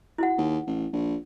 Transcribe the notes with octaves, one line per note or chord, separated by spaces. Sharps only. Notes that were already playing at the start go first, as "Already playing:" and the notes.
E4 F#4 F#5
D#2
A1
A#1